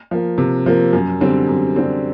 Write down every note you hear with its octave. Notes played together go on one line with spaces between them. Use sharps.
F3 A#3
C3
F3 A#3
F#2
D3 G3 C4
F#2
D3 G3 C4